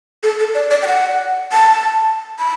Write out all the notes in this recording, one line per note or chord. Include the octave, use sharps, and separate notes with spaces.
A4
A4
D5
D5
G5
F#5
A5
B5